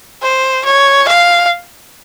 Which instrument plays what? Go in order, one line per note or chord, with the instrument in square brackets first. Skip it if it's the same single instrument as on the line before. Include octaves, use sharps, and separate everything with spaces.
[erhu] C5
C#5
F5